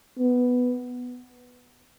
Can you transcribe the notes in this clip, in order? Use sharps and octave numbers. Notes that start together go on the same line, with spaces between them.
B3